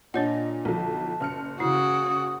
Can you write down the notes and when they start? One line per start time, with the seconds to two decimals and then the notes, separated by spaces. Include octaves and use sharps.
0.14 A#2 D4 C#5 D#5 F#5
0.65 B1 D3 F3 A5
1.20 F#1 F6 C#7
1.60 C#3 E4 F#4 D#6